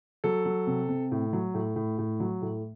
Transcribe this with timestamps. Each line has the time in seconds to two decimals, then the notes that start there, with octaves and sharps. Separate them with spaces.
0.24 F#3 A4
0.45 F#3
0.67 C3
0.89 C3
1.11 A2
1.33 F#3
1.54 A2
1.76 A2
1.98 A2
2.20 F#3
2.42 A2